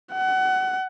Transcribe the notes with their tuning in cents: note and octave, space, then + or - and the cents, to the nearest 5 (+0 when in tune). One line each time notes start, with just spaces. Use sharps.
F#5 +25